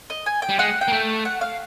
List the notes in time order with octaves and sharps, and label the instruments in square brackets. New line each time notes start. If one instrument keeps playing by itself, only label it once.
[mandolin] D#5
G#5
G5
[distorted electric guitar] G3
[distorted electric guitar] G#3 [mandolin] F#5
[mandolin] G5
[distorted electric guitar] A#3
A3
[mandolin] F#5
F5